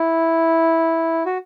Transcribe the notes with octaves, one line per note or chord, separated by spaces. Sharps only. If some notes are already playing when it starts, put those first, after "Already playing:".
Already playing: E4
F#4